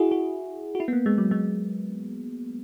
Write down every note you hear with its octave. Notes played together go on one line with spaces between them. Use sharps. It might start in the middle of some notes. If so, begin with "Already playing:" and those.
Already playing: E4 F#4 G#4
F#4
F#4
E4
B3
A#3
G#3
F#3
G#3